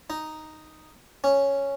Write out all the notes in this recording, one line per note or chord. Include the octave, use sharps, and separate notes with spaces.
D#4
C#4